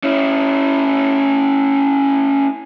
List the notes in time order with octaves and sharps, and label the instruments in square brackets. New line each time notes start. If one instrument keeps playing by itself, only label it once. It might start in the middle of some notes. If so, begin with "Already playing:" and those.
[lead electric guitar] C#4 E4